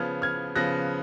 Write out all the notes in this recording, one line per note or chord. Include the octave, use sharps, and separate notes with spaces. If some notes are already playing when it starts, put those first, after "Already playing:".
Already playing: C#3 F3 B3 F6 G#6
F6 G#6
C#3 F3 B3 F#6 A#6